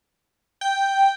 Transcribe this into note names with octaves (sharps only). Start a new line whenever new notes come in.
G5